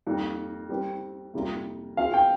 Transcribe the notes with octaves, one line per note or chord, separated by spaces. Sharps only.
F2 D#3 G3 A#3
G3 C4 G4 A#4
F2 C3 G3 A#3 F4
F3 C4 F4 G#4 F5
G5